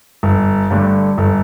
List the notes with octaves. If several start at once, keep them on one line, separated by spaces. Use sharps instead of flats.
G1
G2 D3 A3
G1